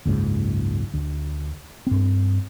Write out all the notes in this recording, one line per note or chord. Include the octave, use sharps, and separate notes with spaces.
F#1 C#2 G#2
D2
G2 C4